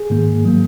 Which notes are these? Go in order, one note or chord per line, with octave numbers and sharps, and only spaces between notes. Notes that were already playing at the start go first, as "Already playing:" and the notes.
Already playing: G#4
G#2 D#3 A#3
F#3 A#3